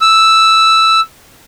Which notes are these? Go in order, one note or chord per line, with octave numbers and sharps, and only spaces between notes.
E6